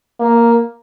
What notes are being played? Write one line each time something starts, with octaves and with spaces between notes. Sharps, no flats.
A#3